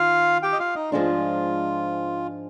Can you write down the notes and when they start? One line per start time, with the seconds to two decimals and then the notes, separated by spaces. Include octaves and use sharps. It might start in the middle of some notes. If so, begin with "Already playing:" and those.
Already playing: D#3 F4 F5
0.43 G4 G5
0.53 D#5
0.59 F4 F5
0.75 D#4 D#5
0.92 G#2 F3 G#3 D4 F4